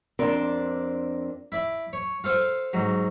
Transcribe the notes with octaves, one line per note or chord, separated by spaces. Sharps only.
F2 C4 D4 A#4 D5
E4 D5
C#5
F4 A4 C5 F5
G#2 F#3